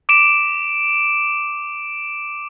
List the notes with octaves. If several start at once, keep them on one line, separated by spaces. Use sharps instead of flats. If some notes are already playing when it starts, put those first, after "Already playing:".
D6 D7 E7